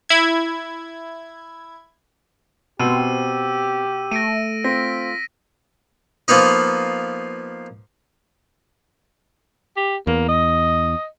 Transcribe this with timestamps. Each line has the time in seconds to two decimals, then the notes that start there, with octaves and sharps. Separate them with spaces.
0.09 E4 G#6
2.80 B2 C4 G4 E6 D#7
4.11 A3 A#6 D7 D#7
4.64 C4 F4 A#6 B6
6.28 F3 A#3 B3 D#4 D#5
9.77 G4
10.07 E2 A#3
10.29 D#5